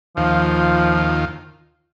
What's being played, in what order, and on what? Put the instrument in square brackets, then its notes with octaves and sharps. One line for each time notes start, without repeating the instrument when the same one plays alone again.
[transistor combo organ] D#2 F4 [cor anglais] F3